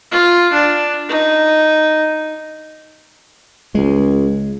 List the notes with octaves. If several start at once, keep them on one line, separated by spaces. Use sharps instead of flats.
F4
D4
D#4
C#2 G#3